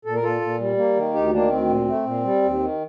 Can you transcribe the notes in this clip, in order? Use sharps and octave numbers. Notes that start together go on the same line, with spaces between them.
A#2 A4
A#4
A#2 F4 A4
A#2
G3
A#3
D#3
D2 D#4 G4
D#3 A#3 D4
D2 C4
A#2
A3
A#2
G3
D#2
D#3